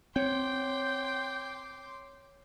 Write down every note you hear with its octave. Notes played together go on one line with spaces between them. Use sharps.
C4 C#5 G5 C6 D6